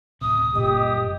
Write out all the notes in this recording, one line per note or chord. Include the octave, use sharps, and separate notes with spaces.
D1 C3 D#6
F#1 A#2 G3 G4 D#5